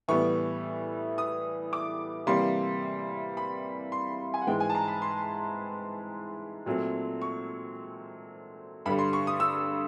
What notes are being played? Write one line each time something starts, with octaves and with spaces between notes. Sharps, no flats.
A2 E3 G3 B3 C#6
D#6
D6
C3 E3 G3 A#3 C6
B5
C6
G#5
F#5
G#2 E3 G#3 G5
G#5
A5
A#5
B5
C6
A#2 F#3 A3 C4
C#6
G2 D3 G3 B5
C6
C#6
D#6
E6